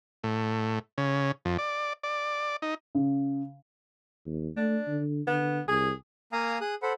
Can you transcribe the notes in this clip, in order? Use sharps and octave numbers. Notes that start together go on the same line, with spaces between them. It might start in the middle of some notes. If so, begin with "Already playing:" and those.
A2
C#3
F2
D5
D5
D#4
C#3
D#2
A3 D4
D3
D3 B3
C2 G#4
A#3 F5 G#5 A#5 D#6
G#4 D#6 F#6
A4 C5 F#5 B5